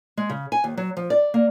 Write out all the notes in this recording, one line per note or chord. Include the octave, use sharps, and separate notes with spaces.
G#3
C#3
G#5
D#2
F#3
F3
D5
A#3